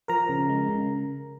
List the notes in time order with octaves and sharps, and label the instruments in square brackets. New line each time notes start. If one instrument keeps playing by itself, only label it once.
[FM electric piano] F3 A#4 A#5
C#3
G#3
C#3